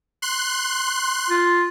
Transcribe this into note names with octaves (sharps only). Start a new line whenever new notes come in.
C6 F#6
F4